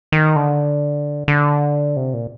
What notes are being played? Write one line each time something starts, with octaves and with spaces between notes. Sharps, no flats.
D#3
D3
D3
C3
A#2